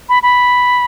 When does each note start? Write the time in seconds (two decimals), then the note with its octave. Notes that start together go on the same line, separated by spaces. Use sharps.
0.09 B5
0.23 B5